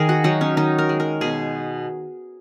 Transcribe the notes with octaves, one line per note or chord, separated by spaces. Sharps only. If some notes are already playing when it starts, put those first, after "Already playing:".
Already playing: D#3 G#4 A#4
F#4
F#3 D#4
C#4
D#3 D#4
A#4
G#3
A#4
B2 G#4